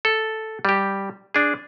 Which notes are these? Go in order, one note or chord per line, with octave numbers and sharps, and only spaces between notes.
A4
G3 G4
D4 G#4